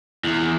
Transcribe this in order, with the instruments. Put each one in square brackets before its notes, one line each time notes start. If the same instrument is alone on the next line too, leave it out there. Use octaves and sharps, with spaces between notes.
[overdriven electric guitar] E2